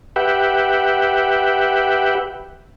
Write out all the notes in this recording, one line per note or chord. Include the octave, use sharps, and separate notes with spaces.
G4 B4 E5 F#5 G5